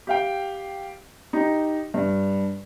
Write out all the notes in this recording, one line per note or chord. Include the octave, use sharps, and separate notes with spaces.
G4 F5 G5
D#4 G4
G2